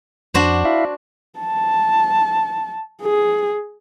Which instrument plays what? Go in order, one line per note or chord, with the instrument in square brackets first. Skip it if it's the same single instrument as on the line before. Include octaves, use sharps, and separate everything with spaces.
[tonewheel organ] F2 [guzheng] D4 F#4 C5
[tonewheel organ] E4 E5 F5
[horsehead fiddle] A5
G#4